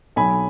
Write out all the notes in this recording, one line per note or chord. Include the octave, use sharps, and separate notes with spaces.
B1 G#5 B5